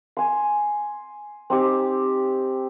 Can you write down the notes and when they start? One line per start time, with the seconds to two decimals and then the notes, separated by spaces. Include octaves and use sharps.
0.17 G#5 C6
1.50 C4 D#4 G4